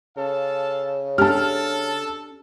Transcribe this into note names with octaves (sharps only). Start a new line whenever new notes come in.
C#3 A4 F5 A5
D4 G4 A4 A5 F6